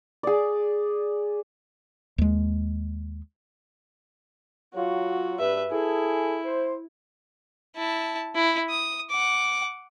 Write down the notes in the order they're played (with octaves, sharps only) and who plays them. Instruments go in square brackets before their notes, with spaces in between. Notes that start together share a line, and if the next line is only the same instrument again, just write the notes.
[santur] G#4 D5
[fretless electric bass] D#2 G#3
[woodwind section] F#3 F4 [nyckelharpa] F#4
[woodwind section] G2 [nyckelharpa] B4 E5
[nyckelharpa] E4 [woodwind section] G#4 A4
[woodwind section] C5
[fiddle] E4 A5
E4
D#6
F#5 D6